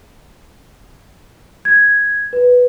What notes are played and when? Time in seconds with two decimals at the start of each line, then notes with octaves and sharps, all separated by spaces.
1.65 G#6
2.33 B4